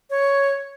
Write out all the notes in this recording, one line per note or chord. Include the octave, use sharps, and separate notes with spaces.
C#5